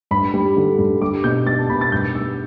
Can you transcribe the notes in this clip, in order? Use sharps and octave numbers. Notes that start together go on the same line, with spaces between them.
G2 B5
G3
D3
G2
G3 D6
B2 G6
G3 A6
A5
B2 B5
A6
G2 G6
G3 E6